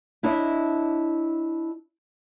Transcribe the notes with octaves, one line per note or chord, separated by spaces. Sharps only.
D4 E4 C#5 D#5 E5